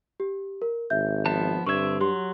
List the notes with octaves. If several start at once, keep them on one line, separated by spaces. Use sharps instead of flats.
G4
A#4
G#1 E5 G6
F3 B3 A5
G2 D3 C4 E5 C#6 G#6
F#3 G4 C6